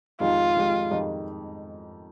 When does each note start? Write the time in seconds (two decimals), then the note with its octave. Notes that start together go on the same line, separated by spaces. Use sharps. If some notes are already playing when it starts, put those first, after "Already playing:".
0.20 F2 D#3 G#3 D#4 F4 G4
0.55 F2 D#3 G#3 D#4 G4
0.91 F2 D#3 G#3 D#4 G4